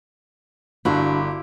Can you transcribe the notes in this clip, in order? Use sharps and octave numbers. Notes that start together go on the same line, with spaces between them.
G1 D4 E4 F#4 D5 F5